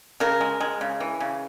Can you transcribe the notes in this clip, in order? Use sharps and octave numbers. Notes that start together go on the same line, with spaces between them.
C#3 A#4
G#3
G#3
C#3
E3
C#3